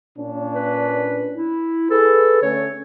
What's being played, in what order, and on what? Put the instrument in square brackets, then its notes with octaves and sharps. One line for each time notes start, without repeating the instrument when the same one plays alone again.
[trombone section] A#2 C#4 D4
[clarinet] B4
E4
[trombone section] G#4 B4 [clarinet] A4
[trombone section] D3 A3 C#4 [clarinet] C#5